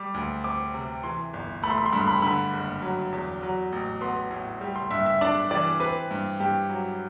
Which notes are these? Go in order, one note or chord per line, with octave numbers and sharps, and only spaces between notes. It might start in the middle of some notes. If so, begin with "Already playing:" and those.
Already playing: G3 D6
D2
C4 D6
C3
E3 C6
G1
A3 B5
C6
B5
C6
G2 B5
C6
B5
D3 B5
F#1
F#3
E2
F#3
A1
B3 C6
A2
G3
C6
G2 E5
E5
D4 D5
E3 D5
C4 B4
G2
G2 G4
F#3